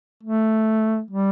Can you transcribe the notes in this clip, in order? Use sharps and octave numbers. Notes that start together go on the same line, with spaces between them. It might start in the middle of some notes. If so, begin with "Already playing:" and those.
A3
G3